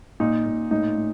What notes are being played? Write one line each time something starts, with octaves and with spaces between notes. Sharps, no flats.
A#2 D#4
A#2
A2 D#4
A2